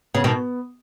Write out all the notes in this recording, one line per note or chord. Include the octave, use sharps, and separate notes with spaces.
C#3 B3
B2 D#3